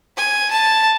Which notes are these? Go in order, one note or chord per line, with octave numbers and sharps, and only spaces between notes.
G#5
A5